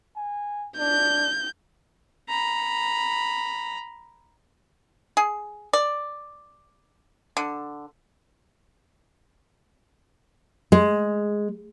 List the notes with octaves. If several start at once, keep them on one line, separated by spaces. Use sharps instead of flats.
G#5
D4 G6
A#5 B5
G#4
D5
D3
G#3